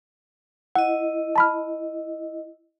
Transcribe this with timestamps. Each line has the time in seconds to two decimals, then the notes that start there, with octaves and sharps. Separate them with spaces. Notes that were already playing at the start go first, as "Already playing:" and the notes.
0.75 E4 D#5 F#5
1.36 A5 B5 F6